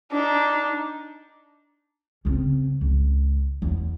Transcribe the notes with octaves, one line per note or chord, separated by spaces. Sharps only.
D4 D#4
C#3 C4
C#2
E2